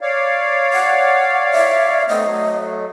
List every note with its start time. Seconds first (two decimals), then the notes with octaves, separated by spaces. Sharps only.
0.01 C#5 D5 F5
0.73 F#5
1.52 E5
2.09 A3 B3 C4 D#5
2.25 F#3 A3